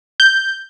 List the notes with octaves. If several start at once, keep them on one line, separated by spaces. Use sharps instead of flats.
G6